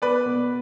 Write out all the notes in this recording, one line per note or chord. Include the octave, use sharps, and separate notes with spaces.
B3 B4 D5
B2